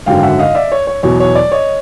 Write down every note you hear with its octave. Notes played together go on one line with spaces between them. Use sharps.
G#1 F#2 D3 F#3 F5 G5
E5 F#5
D#5 F5
D5 E5
C#5
C#5
E2 B2 F#3 C#5
C#5
D5
C#5 D#5